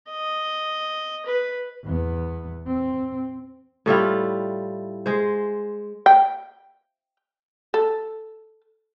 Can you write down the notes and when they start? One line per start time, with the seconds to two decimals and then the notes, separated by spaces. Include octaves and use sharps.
0.10 D#5
1.26 B4
1.84 E2 B3
2.67 C4
3.86 A2 G3 E4 F4
5.06 G#3 C5
6.06 G5
7.74 A4